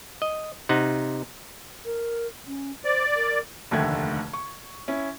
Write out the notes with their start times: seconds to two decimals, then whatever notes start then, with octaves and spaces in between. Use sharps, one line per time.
0.22 D#5
0.69 C3 D#4 F#5
1.85 A#4
2.47 C#4
2.84 C5 D5
3.16 A#4
3.71 F1 D#2 D3 A3 G#6
4.33 C#6
4.88 C#4 E4